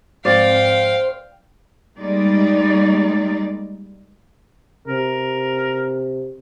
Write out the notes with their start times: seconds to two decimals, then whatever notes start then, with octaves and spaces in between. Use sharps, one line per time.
0.25 G#2 F3 C4 C5 D5 F5 G5
1.98 G3 G#3 A#3 D#4 D5
4.87 C3 A#4